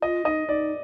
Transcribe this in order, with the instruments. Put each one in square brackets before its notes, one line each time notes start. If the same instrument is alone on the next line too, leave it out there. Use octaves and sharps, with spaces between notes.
[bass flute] F4 [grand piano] D#5
[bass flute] D#4 [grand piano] D#5
[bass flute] D#4 [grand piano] D5